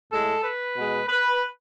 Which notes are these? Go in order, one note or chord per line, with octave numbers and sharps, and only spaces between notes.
A2 G#3 A4
B4
B2 G#3
B4